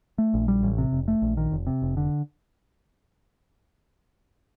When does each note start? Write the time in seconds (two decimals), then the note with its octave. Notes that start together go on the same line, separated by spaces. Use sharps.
0.18 A3
0.34 A#1
0.48 G3
0.63 A1
0.78 C3
0.92 F1
1.08 A3
1.22 A#1
1.37 D#3
1.52 F1
1.67 C3
1.82 F1
1.97 D3